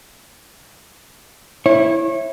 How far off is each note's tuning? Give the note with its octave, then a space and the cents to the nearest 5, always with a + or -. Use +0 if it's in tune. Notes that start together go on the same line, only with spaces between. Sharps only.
E4 +0 C#5 -30